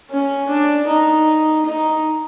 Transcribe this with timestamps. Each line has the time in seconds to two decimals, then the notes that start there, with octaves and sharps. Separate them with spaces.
0.11 C#4
0.49 D4
0.88 D#4
1.66 D#4